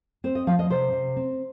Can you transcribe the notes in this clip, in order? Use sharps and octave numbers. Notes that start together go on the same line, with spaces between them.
C4 C5
D#5
F3 F5
D#5
C3 C5
C3
C4